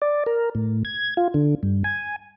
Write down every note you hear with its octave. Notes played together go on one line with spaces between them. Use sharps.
D5
A#4
A2
G#6
F4
D3
G2
G#5